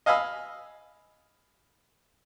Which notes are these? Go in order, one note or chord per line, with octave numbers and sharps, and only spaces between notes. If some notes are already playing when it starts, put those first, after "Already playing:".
D#5 F5 G#5 B5 E6